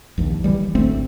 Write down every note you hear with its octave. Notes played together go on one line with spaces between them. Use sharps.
A#1 D#2 E3
D1 E3 G3
G#1 D2 A3 C4